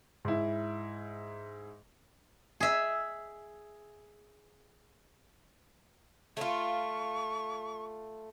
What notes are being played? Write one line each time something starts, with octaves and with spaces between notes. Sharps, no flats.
G#2 E4
G#4 E5
A3 F4 C#6